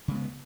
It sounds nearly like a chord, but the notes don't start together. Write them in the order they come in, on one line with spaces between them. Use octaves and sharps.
C#3 G#3 B3